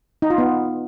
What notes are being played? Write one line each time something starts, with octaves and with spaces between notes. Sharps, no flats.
D#4
F4
B3